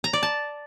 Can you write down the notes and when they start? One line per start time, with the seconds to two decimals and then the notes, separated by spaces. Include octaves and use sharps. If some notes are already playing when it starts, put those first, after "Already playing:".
0.04 A#5
0.13 D5
0.23 A5